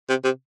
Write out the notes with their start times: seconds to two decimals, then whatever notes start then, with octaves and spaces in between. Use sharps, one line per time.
0.09 C3
0.24 C3